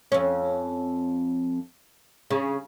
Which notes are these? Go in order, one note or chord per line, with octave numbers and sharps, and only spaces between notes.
F2 C#4
C#3